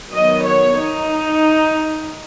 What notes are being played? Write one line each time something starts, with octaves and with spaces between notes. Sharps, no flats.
D#3 F#3 B3 D#5
C#5
D#4